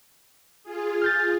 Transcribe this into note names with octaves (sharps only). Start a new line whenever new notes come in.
F4 G#4
F6 G6 A6